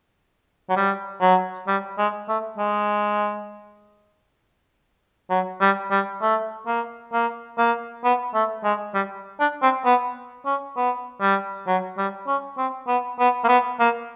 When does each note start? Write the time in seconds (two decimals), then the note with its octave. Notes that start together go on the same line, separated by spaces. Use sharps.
0.70 F#3
0.76 G3
1.21 F#3
1.67 G3
1.98 G#3
2.28 A3
2.58 G#3
5.30 F#3
5.61 G3
5.91 G3
6.22 A3
6.67 A#3
7.13 A#3
7.58 A#3
8.04 B3
8.34 A3
8.64 G#3
8.95 G3
9.40 D4
9.62 C4
9.85 B3
10.46 C#4
10.77 B3
11.21 G3
11.67 F#3
11.98 G3
12.27 C#4
12.57 C4
12.88 B3
13.19 B3
13.44 A#3
13.48 B3
13.80 A#3